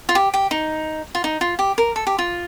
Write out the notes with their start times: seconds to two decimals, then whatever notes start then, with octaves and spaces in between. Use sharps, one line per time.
0.09 F4
0.15 G4
0.34 G4
0.51 D#4
1.15 F4
1.24 D#4
1.41 F4
1.59 G4
1.78 A#4
1.96 A4
2.07 G4
2.19 F4